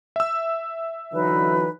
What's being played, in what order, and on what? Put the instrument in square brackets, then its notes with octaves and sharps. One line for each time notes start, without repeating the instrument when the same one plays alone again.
[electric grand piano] E5 E6
[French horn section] D3 E3 F#3 [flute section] D#4 B4